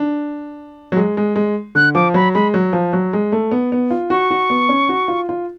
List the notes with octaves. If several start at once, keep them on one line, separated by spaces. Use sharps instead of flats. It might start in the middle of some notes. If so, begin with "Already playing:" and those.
Already playing: D4
F#3
G#3
G#3
G#3
D3 F#6
F3 D6
F#3 B5
G#3 B5
F#3
F3
F#3
G#3
A3
B3
B3
F4
F#4 C#6
F#4
B3
C#4
F#4
F4
F4